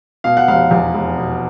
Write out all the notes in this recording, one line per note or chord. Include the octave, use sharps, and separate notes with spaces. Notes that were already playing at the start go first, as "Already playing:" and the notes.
B2 F5
F#5
F1 F5
E2
F1
B2